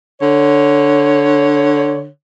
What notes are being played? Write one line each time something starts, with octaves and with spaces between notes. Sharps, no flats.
D3 C#5